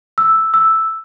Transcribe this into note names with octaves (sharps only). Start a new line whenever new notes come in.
E6
E6